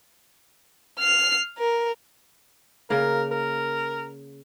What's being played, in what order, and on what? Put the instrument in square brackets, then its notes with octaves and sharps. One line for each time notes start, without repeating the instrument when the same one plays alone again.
[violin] F6 C7
A#4
[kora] C#3 A#3 [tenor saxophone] A#4
[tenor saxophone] A#4